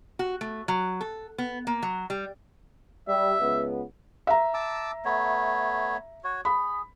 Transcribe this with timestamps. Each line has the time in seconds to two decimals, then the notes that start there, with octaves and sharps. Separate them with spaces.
0.19 F#4
0.41 A3
0.68 F#3
1.01 A4
1.38 B3
1.67 A#3
1.83 F#3
2.10 G3
3.09 G3 E5
3.40 C#2 B3
4.27 E5 A#5
4.54 A5 D6 E6
5.05 A3 B3 C#5
6.24 F#4 C#5
6.45 G#4 B5